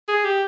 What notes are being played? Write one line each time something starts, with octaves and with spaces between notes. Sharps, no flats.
G#4
G4